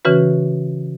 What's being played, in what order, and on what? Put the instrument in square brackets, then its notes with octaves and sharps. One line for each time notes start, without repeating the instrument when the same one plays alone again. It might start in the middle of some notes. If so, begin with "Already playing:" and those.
[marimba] C#3 E3 C#4 F#4 B4